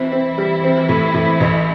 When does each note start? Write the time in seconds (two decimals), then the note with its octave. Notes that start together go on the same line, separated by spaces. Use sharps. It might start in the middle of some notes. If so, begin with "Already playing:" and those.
Already playing: E3 C4 E4
0.12 C4
0.38 G3
0.64 C4
0.89 A2
1.14 A2
1.40 A1